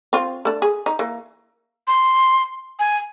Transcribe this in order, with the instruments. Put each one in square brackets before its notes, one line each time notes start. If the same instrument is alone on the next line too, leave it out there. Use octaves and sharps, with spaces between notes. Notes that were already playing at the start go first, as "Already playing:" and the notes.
[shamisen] C4 F4
A3 D4
G#4
D#4
E3 A#3
[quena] C6
G#5